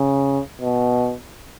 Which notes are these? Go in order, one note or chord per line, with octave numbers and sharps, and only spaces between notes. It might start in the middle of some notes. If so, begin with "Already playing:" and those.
Already playing: C#3
B2